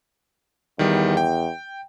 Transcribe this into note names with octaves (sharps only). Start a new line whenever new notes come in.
E2 D#3 G3
G5